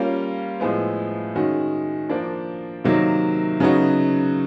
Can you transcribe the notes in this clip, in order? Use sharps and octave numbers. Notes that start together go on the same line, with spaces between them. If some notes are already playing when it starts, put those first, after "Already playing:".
Already playing: G3 A#3 C#4 F4
A2 F3 G#3 B3
D#3 G#3 C#4 F#4
F3 A#3 D4
C3 D#3 F#3 A#3
C#3 F#3 B3 D#4 F#4